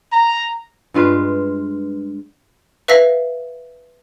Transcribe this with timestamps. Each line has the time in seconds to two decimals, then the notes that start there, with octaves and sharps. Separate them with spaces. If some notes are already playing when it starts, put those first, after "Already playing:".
0.12 A#5
0.94 G2 G#3 F4 B4
2.88 B4 E5 F5 E6 A#6 B6